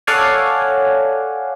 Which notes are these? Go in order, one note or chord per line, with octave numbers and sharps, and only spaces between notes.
A4 C#5 D5 F5 F#5 G#5